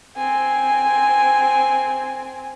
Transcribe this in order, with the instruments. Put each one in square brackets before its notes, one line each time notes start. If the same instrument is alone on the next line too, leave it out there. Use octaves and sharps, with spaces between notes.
[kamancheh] C4 G#5